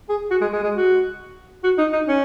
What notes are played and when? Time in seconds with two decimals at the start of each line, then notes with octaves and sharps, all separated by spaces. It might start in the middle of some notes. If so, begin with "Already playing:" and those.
0.09 G#4
0.30 F#4
0.41 G#3
0.53 G#3
0.63 G#3
0.74 F#4
1.64 F#4
1.78 D#4
1.93 D#4
2.08 C#4